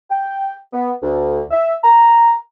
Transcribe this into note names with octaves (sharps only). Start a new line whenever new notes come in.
G5
B3
D2
E5
A#5